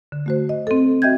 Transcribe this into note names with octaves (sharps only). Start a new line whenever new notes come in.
D3
A3 F#4 C5
D#5
C4 A4
F#4 D#5 E5 G5 G6 G#6